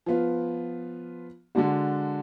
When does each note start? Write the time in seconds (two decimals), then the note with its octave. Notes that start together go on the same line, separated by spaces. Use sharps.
0.06 F3 B3 F4
1.55 D3 G#3 D4 F#4